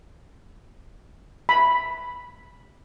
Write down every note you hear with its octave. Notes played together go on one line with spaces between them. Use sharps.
B5